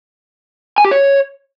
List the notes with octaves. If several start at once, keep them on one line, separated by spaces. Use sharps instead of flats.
G#5
G4
C#5